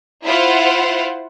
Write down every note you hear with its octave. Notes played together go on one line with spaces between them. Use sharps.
E4 F4 C5 F#5